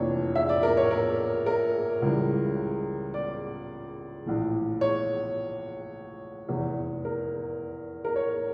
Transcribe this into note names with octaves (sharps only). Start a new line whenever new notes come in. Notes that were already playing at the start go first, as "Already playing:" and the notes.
Already playing: F1 F2 E3 A#3 D4 C#5
E5
D5
A#4
C#5
A#4
A#4
C#2 C#3 E3 G3
D5
A#1 A2 E3
C#5
F1 E2 E3
A#4
A#4
C#5